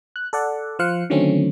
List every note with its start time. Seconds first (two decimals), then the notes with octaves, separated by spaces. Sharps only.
0.16 F#6
0.33 A4 D5 F#5
0.79 F3 C5 F5 F#6 C#7
1.10 D3 D#3 F#3 A3 C4 C#4